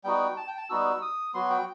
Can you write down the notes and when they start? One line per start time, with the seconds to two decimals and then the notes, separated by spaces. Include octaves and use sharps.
0.04 G3 B3 D#4 F#4 G5
0.37 A5
0.47 G5
0.57 A5
0.70 G3 B3 D#4 F#4 E6
1.02 D#6
1.34 F#3 B3 F#4 C6
1.50 G5